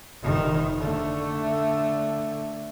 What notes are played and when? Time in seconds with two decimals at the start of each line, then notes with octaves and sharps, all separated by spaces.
0.23 F1 D#3
0.78 D3 A3